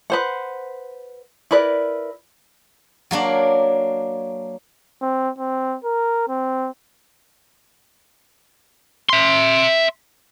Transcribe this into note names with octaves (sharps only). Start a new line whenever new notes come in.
B4 C5 F#5
E4 A#4 B4 D5
F#3 A#3 D4
C4
C4
A#4
C4
E5 C6